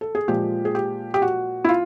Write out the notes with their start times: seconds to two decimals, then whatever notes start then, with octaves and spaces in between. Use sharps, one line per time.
0.01 A4
0.15 G#4
0.28 A#2 F3 G#3 G4
0.65 G#4
0.75 G4
1.14 G4
1.22 F#4
1.65 E4
1.69 F4